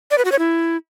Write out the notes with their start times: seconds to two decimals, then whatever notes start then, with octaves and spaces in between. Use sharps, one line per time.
0.11 D5
0.18 B4
0.25 F#4
0.32 C#5
0.39 E4